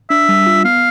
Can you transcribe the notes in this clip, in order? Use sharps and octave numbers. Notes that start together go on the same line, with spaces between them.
D4 E5
G3
F4
B3 F5